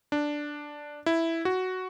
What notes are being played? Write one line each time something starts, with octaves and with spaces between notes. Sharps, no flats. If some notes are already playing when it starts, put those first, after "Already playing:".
D4
E4
F#4